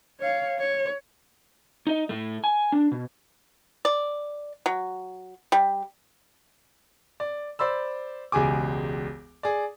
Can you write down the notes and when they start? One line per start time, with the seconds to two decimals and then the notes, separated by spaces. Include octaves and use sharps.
0.20 C#5 F5
0.59 C#5
1.87 D#4 D#5
2.09 A2 A3
2.44 G#5
2.72 D4
2.92 B2
3.85 D5
4.66 F#3
5.52 G3
7.20 D5
7.59 C5 D5 B5 E6
8.32 E1 C#2 G4 G#4 G#5 D6
9.43 G#4 D5